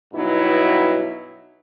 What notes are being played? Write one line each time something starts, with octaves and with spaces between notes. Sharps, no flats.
G2 B2 F#3 D#4 E4